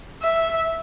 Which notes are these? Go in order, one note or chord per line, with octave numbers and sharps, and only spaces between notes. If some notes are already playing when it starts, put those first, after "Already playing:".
E5